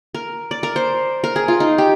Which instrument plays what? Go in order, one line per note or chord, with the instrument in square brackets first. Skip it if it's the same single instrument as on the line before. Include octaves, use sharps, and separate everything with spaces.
[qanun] A#4
D5
A#4
C5
A#4
G#4
F4
D#4
G4